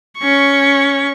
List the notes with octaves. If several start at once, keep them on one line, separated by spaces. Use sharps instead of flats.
C#4 C#6